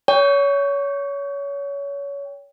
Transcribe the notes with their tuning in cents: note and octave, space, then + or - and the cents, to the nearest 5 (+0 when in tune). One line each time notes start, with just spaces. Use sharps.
C#5 +25 G5 +15